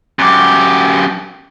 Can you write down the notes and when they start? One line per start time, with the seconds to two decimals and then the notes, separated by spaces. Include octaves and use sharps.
0.19 F#2 G4